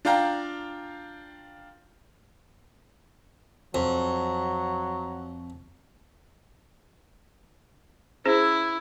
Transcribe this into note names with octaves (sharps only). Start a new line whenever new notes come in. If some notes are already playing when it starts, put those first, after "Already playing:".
D4 F4 F5 G5 A#5
F2 F#3
C#4 E4 G#4 C5